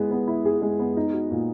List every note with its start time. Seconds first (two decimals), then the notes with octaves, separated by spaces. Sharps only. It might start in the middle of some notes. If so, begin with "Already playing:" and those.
Already playing: G#3 B3 E4 G#4
0.11 B3
0.27 E4
0.45 G#4
0.62 G#3
0.79 B3
0.97 D#4
1.13 F#4
1.31 A#2